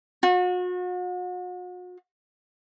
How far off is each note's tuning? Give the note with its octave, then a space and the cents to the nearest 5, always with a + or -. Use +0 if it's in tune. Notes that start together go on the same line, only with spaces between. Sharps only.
F#4 -40